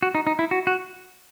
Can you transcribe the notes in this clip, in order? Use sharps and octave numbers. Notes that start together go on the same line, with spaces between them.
F#4
D#4
D#4
E4
F#4
F#4